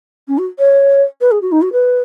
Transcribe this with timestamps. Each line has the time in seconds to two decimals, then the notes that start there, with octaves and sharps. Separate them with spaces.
0.28 C#4
0.38 F#4
0.59 C#5
1.21 B4
1.31 G#4
1.41 F#4
1.52 D#4
1.62 F#4
1.73 B4